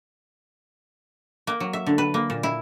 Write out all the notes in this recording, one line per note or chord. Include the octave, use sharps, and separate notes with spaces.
A#3
F#3
E5
D3
B4
A#3
A#2
E4